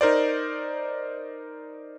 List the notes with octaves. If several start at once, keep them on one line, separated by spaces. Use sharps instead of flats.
D#4 A#4 C5 D5